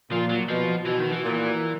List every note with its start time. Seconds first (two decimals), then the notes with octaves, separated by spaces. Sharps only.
0.11 A#2 F3
0.29 F#3
0.49 B2 F3
0.86 B2 E3
1.00 D#3
1.12 E3
1.24 A#2